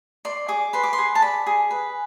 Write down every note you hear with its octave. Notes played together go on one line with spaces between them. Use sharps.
D5 C6
G#4 D6
B4 C6
D6
C6
G#4
A5
D5 B5
G#4
B4